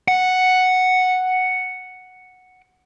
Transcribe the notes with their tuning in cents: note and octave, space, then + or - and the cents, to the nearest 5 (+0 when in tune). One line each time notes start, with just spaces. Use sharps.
F#5 +0